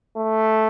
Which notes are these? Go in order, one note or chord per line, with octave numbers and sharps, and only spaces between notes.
A3